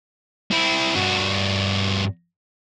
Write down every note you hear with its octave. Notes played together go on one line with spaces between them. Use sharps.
C4 E4
G2 F#4